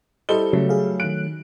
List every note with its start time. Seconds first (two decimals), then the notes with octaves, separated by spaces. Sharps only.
0.29 G3 E4 A4 C5 D#5 G7
0.53 C#3 F#3 A3
0.69 G#4 F5
1.00 D#3 F#6 D7